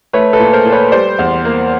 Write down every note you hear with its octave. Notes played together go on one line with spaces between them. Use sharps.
A3 B4 C#5
A4 B4
A#2
A#4 C5
A#2
B4 C#5
G3 C5 D5
E2
A#3